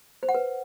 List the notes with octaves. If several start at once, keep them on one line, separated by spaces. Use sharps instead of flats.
C5
F#5
B4